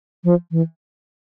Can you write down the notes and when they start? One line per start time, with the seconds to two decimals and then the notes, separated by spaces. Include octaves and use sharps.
0.24 F3
0.51 E3